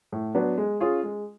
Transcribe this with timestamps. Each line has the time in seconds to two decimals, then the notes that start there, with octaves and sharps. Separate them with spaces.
0.12 A2
0.35 F#3 B3 D4
0.58 G#3
0.80 C#4 F4 G#4
1.03 G#3